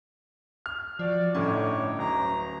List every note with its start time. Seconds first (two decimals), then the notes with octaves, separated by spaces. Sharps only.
0.66 F6
0.99 F3 F#4 D5
1.35 G1 A2 D3 C#4 D#4 C#5 D6
1.99 D1 A#5